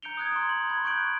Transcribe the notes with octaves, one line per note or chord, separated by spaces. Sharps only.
A#5 G6 C#7 D7 F7 G7
D#6 F#6 G#6
A#5 C6
C6 F#7
B5 G#6
C#6 F#6 G6 D7 F#7